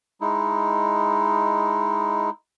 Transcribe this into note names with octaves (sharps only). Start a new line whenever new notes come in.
G#3 D#4 E4